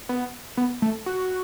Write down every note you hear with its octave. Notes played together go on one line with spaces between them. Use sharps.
B3
B3
A3
F#4